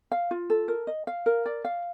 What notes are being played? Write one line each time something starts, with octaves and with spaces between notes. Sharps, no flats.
F5
F4
A4
A#4
D#5
F5
A#4
D5
F5